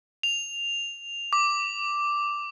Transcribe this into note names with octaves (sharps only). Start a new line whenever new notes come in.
F7
D6